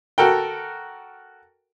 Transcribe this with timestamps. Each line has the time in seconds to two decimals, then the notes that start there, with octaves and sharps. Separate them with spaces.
0.18 F#4 A4 A#4 G5